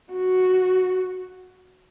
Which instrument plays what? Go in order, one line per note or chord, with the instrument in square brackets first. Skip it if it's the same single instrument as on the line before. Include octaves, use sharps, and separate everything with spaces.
[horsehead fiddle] F#4